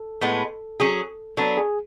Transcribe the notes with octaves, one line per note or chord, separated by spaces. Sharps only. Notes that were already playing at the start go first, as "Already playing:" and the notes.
Already playing: A4
A2 G#3 B3
F#3 C#4 G#4
F#3 B3 D4 A4
G#4